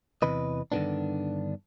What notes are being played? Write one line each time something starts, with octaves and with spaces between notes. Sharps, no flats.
E2 C3 E3 B4 D#5
G2 D3 D#3 F3 B3 D4